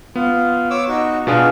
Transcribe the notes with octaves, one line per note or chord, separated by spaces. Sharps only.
B3 F4
C#5 D6 E6
D#4 F#4 C#6
B2 B3 D4 F4 G#4